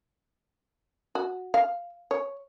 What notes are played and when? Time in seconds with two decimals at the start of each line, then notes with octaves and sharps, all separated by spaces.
1.15 F#4
1.54 F5
2.11 C#5